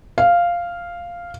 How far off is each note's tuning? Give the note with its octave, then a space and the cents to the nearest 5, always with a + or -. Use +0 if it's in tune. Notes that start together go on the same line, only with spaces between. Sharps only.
F5 -5